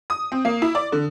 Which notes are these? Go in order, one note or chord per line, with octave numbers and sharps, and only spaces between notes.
D#6
C4
A#3
E4
D5
D3